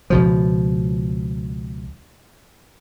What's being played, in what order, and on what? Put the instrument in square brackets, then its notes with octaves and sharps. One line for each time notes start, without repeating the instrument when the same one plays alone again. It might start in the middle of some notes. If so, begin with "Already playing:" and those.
[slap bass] C#2 B2 F3